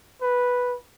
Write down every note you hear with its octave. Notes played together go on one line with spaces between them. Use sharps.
B4